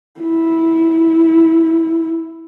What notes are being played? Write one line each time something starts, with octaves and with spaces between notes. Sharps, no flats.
E4